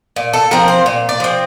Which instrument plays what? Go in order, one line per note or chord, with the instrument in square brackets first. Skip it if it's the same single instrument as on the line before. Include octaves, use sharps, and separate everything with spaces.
[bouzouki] A#2
A4
F3 C4 A#4
C5
A#2
D5
F3 C4